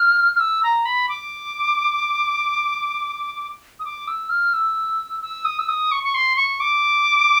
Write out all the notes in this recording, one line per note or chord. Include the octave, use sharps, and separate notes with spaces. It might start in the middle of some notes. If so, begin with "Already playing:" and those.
Already playing: F6
F6
E6
A#5
B5
D6
D#6
D6
E6
F6
E6
E6
D#6
E6
D#6
C#6
C#6
C6
C#6
D6